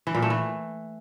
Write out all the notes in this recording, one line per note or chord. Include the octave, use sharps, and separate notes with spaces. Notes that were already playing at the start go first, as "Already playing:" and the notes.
E3
A#2
A3
E3